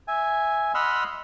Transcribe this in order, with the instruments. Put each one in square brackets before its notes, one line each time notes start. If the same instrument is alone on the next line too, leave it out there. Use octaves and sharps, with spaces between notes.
[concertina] E5 G#5
D#5 F#5 B5 C6 E6 F6